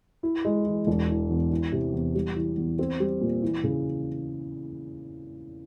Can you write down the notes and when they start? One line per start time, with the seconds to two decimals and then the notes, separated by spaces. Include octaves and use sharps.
0.23 E4
0.45 G#3
0.66 E3
0.87 E1
1.09 E3
1.30 E2
1.51 E3
1.72 C3
1.94 E2
2.15 G3
2.36 E3
2.57 E2
2.79 C4
3.00 G3
3.21 A#2
3.42 E3
3.64 C#3